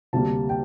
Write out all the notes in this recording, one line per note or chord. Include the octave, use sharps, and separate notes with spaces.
D2 C3 G3 A#3 A5
G5